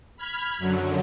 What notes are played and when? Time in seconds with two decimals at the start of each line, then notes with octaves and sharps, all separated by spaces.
0.17 B5 F6 G#6
0.59 F#2 D3 F#3